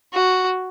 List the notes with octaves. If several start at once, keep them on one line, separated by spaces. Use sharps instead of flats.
F#4